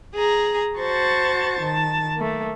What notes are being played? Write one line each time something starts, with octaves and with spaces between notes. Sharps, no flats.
G#4 A#5
F#4 C5 A5 C#6 A6
D#3 A5
A3 A#3